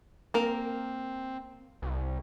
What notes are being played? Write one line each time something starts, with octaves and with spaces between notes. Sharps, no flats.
A#3 C4 A#4
C2